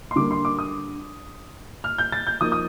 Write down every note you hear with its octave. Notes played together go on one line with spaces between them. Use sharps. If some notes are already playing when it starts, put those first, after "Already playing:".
C6
D3 G3 A#3 D6
C6
D6
D#6
F6
G6
A6
G6
F3 A#3 D#4 D#6
D#6